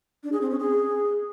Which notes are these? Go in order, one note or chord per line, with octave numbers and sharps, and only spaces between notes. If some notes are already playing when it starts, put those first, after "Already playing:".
D4
G#4
C4
C#4
G#4